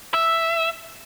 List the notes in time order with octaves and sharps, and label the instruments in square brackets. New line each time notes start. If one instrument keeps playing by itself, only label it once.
[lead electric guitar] E5